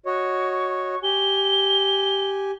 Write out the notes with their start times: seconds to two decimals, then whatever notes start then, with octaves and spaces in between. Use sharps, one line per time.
0.06 F#4 C#5 D#5 C#6
1.03 G4 G#5 G7